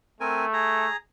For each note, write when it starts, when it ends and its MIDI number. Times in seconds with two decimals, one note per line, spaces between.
0.20 0.87 57
0.20 0.45 60
0.20 0.45 70
0.20 0.45 80
0.53 0.97 68
0.53 0.97 82